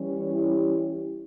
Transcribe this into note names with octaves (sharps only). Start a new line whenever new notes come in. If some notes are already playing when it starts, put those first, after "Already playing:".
Already playing: E3 G3 C#4
E4 G4